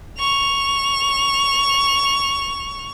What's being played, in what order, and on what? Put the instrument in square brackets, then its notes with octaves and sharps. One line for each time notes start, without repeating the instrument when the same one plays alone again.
[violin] C#6 F7